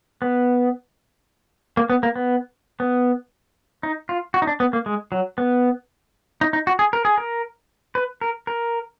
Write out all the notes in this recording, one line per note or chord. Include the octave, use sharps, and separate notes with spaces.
B3
A#3
B3
A#3
B3
B3
D#4
F4
F#4
D#4
D4
B3
A#3
G#3
F#3
B3
D#4
D#4
F#4
G#4
A#4
G#4
A#4
B4
A#4
A#4